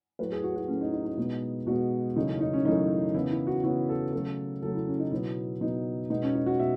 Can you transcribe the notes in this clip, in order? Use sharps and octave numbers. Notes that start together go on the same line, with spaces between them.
A2 F#3 A3 B4
G#4
F#4
F#4
A2 F#3 A3 C#4
D#4
D#4
D#4
B2 G#3 B3
B2 G#3 B3 F#4
F#2 C#3 E3 A3 D#4
C#4
D#4
C#4
F#2 C#3 E3 A3 D#4
C#3 E3 B3 E4
E4
F#4
C#3 E3 B3 F#4
A4
C#3 F#3 A3 A4
C#3 F#3 A3 A4
E4
C#4
D#4
B2 F#3 B3 E4
B2 F#3 B3 D#4
B2 G#3 B3 D#4
C#4
D#4
F#4
B2 E5